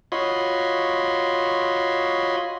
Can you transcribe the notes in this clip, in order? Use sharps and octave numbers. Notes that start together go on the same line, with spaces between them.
F4 F#4 C#5 D#5 B5 C6